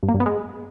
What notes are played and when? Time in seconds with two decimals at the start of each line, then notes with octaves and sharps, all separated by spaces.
0.03 G2
0.09 A#3
0.14 G2
0.20 B3
0.26 G#3